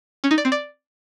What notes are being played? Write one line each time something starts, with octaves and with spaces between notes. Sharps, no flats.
C#4
D#4
D5
C4
D5